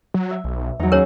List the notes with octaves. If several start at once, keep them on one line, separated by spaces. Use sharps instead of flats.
F#3
E5
B1
E2 F#3 D#4
D#2 C#4 G#4 A#4 C#5